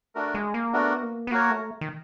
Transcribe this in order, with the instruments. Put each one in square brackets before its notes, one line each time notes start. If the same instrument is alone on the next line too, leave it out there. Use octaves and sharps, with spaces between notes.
[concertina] A3 D4 F#4 A#4
[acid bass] G#3
A#3
[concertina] A3 D4 F#4 A#4 [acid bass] B3
[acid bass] A#3
B3
[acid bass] A#3 [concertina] F#4 A#4 C#5
[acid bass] A3
D#3